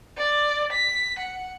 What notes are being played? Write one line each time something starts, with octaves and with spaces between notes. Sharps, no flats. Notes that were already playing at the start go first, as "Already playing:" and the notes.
D5
B6
F#5